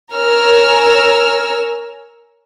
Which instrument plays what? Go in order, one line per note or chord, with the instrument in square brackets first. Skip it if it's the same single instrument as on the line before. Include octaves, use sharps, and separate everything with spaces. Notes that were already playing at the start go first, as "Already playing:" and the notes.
[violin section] A#4 C#5 G#5 A#5 E6 F6